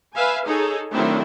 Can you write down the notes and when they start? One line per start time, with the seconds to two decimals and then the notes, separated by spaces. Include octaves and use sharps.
0.14 B4 E5 F5 G#5
0.46 D#4 G#4 A4 C#5
0.92 D#3 F#3 A3 C4 D4 E4